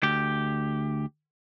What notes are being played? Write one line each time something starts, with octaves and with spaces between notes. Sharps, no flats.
D2 G4